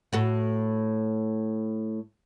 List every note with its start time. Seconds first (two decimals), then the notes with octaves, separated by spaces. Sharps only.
0.13 A2 F#4 A4